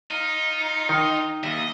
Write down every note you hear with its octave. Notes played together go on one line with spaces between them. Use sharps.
D#4 F4
D#3
D#2 D#5 E5